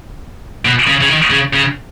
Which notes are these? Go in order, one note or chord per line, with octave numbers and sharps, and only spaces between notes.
B2
C#3
C#3
D#3
C#3
C#3